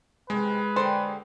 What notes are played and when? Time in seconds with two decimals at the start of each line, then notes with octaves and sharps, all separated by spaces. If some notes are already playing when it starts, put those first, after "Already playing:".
0.30 C3 D#3 G#3 B4
0.76 D3 A#3 G4 A4 C5